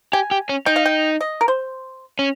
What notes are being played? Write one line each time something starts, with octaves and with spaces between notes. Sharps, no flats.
G4 G#5
G4
C#4
D#4 G5
F5
G5
D#5
A#4
C5
C#4